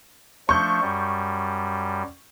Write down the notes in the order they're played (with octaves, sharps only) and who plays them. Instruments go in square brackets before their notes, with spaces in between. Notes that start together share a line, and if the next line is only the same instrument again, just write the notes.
[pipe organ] F3 A3 D4 [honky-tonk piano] C#6 G6
[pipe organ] F#2 G3